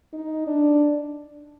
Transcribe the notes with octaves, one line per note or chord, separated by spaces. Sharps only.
D#4
D4